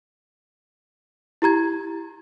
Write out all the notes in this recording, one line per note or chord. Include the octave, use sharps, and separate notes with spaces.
E4 G4 A#5 G#6